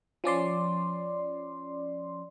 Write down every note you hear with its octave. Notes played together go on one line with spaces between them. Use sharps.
F3 C#4 D5 C6